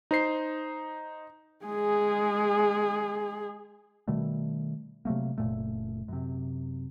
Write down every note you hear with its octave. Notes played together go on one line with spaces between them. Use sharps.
D#4 C5 C7
G#3 G#4
B2 D#3 G3 A3
C3 F#3 A3 A#3
F#1 A#2 A3
F#2 C3